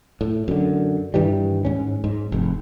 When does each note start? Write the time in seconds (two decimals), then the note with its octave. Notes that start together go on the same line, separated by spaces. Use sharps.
0.21 A2
0.48 F#2 D3
1.14 G2 D#3 E3 G3
1.65 G#2 C#4
2.04 G#2
2.32 F1